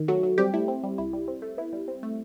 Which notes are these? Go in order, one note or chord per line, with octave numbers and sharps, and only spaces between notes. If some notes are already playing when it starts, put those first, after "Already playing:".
Already playing: D#3
F#3 A3 F#4
F#3
G3 C4 G4
A3 E4
C4
G3
C2 E4
G3
C4
A3
B3 E4
G3
C4
A3